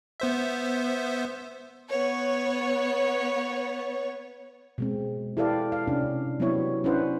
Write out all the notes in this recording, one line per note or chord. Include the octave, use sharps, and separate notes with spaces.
B3 C5 E5
B3 C#5
B2 G#3 C4
E4 G4 A4 B4 D5 F5
F5
C3 C#4 D4
F#3 G3 B3 C4 E4 C#5
C#4 D4 E4 B4 C5 F#5